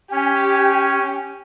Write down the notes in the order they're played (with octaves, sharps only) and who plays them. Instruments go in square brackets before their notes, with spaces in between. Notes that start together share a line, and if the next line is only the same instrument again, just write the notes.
[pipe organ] C#4 [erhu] G4 [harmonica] G#5